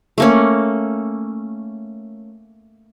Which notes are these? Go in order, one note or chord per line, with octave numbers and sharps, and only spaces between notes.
A3 A#3 C#4